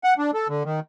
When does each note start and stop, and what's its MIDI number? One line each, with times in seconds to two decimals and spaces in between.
0.04 0.14 78
0.18 0.31 62
0.34 0.48 69
0.49 0.63 50
0.65 0.80 51